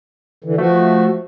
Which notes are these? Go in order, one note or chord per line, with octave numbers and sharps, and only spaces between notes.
D3 E3
F3 A3 F#4